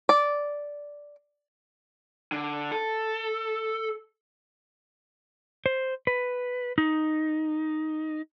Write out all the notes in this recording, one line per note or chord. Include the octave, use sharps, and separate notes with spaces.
D5
D3
A4
C5
B4
D#4